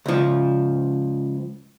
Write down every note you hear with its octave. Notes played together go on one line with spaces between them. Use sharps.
C#2 F3